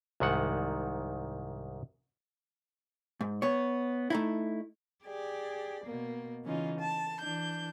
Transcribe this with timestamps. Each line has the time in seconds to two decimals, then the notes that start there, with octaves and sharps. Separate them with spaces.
0.20 C2 G#2 D#3 F#5
3.21 G#2
3.42 B3 C#5
4.10 A3 D#4 E4
5.05 G4 G#4 D5
5.84 B2 A#3
6.44 C#3 E3 C#4 D#4 F4
6.79 A5
7.20 E3 D4 G6